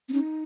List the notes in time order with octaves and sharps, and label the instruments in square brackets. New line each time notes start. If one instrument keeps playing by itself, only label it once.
[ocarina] C4
[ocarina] C#4 [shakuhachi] D#4